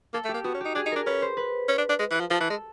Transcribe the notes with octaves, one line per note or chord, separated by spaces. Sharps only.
A#3 A4
A3
G4
A#3
B3 F#4
C#4
D#4 G4
D4 G#4
D#4
D4 A#4
C#4 B4
C5
B4
C#4
D4
D4
G#3
E3
F3
F3 A4
E3
G#3